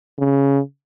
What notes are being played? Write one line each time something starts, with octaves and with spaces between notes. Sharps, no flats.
C#3